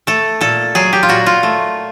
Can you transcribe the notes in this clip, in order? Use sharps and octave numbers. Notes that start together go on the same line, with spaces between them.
A3 A4
A#2 A4
F#3 G#4
G4
F4
A#2 F#4
F4
A3